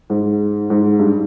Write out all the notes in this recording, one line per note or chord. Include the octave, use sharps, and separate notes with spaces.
G#2
G#2
G2